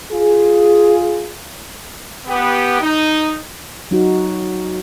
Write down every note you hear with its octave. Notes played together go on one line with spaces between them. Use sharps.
F4 G#4
B3 G4
D#4
F#3 D#4 F#4